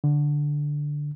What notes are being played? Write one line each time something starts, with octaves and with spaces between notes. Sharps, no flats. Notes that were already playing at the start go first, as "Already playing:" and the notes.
D3